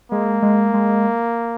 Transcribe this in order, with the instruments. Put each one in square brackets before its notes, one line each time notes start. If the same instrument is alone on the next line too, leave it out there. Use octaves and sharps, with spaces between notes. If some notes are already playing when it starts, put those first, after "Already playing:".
[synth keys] G#3 [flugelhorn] A#3
[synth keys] G#3
G#3